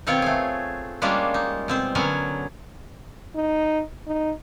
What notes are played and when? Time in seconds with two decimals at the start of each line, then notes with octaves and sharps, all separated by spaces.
0.07 B2 D#3 C4 F4 C#5 G5
0.22 A3 G#4
1.02 G3 G#3 A#3 C#4 D4 F4
1.34 D#4
1.68 B2 C4 C5
1.95 D3 F#3 B3 C#4 A#4 G#5
3.35 D#4
4.07 D#4